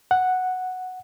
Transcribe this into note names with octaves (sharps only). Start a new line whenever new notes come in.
F#5